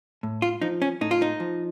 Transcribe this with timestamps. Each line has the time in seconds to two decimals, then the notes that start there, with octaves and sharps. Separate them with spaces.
0.23 A2
0.42 F4
0.62 F3 D#4
0.82 C#4
1.01 A2 D#4
1.11 F4
1.22 D#4
1.40 F3